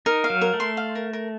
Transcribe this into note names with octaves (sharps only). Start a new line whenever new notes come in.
D#4 A#4
F5
F#3
A#4
A3
C6
F5
A#4
A#4